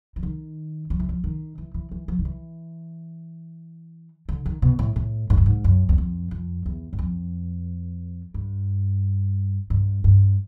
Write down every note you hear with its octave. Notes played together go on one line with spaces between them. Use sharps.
E3
D#3
F3
E3
F3
D#3
E3
E3
E3
F3
D#3
E3
D3
D#3
B2
A2
A2
G#2
G2
G#2
F#2
E2
F2
F2
E2
F#2
F2
G2
G2
G2